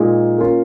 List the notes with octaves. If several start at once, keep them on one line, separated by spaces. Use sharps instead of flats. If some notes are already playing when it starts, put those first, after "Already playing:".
Already playing: A#2 G#3 D#4 G#4
A#3 C#4 F4